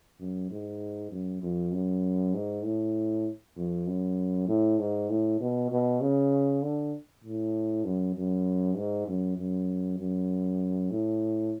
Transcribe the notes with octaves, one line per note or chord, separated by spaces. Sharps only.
F#2
G#2
F#2
F2
F#2
G#2
A2
F2
F#2
A2
G#2
A2
B2
B2
C#3
D3
A2
F#2
F#2
G#2
F#2
F#2
F#2
A2